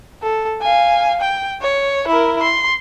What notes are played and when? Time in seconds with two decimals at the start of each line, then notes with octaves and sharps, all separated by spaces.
0.23 A4
0.61 F5 G#5
1.21 G5
1.62 C#5
2.08 E4 A#4
2.42 C6